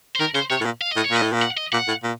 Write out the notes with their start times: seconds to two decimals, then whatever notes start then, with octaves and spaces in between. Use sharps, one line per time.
0.16 C5
0.20 D#3 A#4
0.34 C#3 C5
0.50 C3 C#5
0.61 A2
0.65 A#2
0.81 F5
0.92 A2 D#5
1.04 C#5
1.11 A#2 D#5
1.22 A2
1.33 A#2
1.42 F#5
1.57 D#5
1.73 A#2 F#5
1.88 A2
2.03 A#2